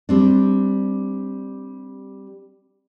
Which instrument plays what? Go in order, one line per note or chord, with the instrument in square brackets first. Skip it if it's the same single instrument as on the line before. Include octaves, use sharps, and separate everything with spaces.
[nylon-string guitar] G3 C4 D4